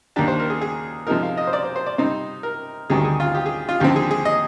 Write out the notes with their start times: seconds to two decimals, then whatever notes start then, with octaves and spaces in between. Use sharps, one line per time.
0.16 D#2 D#3 A#3 D4 G4
0.28 C5
0.39 A#4
0.50 G#4
0.61 G#4
1.07 C3 F3 G#3 D#4 A#4
1.23 F5
1.37 D#5
1.47 C5
1.53 D5
1.64 C5
1.76 C5
1.86 D5
1.98 C3 G3 C4 D#4 C5
2.43 A#4
2.90 D2 C3 D#3 G3 G#4
3.05 G#4
3.20 F4
3.35 G4
3.46 G#4
3.69 F4
3.80 D#2 D3 F3 C4 G4
3.96 G#4
4.11 G#4
4.25 D#5